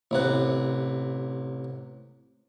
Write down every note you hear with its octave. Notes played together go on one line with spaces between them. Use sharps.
A1 C3 F#5